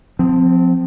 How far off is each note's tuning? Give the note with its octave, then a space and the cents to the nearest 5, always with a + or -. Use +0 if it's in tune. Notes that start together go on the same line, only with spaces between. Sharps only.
F3 +20 C4 -15